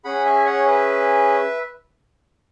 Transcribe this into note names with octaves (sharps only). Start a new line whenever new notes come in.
C#4 G#4 F#5 B5
E5 G#5
C#5 F#5
B4 E5